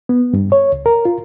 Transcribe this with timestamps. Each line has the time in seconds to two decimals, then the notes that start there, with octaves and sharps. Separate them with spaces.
0.09 B3
0.33 G2
0.52 C#5
0.72 C#2
0.86 A#4
1.05 F4